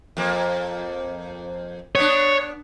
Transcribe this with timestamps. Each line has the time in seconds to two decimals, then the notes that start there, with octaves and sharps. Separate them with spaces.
0.17 F2 A#3
1.95 B3 D4 C#5